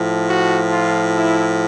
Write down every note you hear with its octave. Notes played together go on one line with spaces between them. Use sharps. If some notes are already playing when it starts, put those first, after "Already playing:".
Already playing: A2 F3
F#4
F4
E4